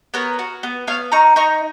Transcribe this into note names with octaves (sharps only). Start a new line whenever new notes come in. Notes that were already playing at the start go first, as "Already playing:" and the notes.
B3 A#4 C#5
F#4
B3
B3 C#5 F5
D#4 A#5 C#6
D#4 A#5 C#6